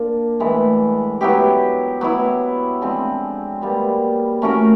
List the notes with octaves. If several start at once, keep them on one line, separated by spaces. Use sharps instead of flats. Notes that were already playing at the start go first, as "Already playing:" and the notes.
Already playing: A#3 D4 F4
A2 E3 G#3
F#3 B3 E4 G4
F#3 B3 E4
D3 F3 G#3 C4
A#2 G3 B3
A3 C#4 F#4 A#4